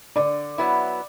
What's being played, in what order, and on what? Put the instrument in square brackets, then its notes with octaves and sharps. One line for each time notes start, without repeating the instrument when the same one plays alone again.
[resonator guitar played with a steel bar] D3 [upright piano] D5
[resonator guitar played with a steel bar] F#3 B3 E4